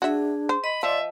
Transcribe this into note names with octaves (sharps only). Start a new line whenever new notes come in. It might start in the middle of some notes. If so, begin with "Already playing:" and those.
D4 F#4 G#4 E5
C5
D#5 B5
F3 D5 E5